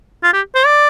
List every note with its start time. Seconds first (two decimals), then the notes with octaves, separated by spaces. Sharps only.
0.24 F4
0.33 G4
0.55 C5
0.66 D5